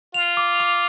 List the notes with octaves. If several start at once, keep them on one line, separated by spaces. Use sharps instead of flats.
F4 F7
D6
D6